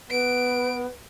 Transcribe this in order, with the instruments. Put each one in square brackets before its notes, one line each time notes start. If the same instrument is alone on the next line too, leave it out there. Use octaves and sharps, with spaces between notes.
[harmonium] B3 [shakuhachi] B4 [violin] D7